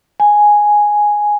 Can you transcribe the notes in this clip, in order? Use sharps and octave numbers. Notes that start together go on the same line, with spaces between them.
G#5